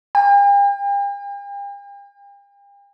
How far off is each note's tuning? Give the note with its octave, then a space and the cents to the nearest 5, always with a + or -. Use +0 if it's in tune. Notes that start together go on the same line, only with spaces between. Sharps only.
G5 +45